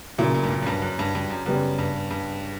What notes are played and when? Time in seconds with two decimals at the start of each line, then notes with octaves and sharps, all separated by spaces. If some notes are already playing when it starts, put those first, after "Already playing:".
0.18 A#2 C#3 F#3 A#3 E4
0.34 A#2
0.43 G2
0.50 A#2
0.62 F#2
0.67 G2
0.82 F#2
0.99 G2
1.15 G2
1.30 F#2
1.46 F#2 C#3 G3 B3
1.79 G2
2.11 G2